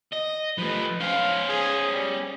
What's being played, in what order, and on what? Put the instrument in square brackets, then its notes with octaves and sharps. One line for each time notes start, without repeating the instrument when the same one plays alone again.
[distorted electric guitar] D#5
[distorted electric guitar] F3 A3 [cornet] B4
[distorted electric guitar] C#4 C5 [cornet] F5
[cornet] G#4
G3